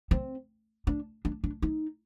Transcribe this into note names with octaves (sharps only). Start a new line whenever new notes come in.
C4
D4
D4
D4
D#4